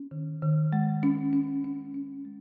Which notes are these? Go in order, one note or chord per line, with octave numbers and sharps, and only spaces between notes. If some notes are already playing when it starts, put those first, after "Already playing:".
Already playing: C#4
D#3
D#3
G#3
C#4
C#4
C#4
C#4
G#3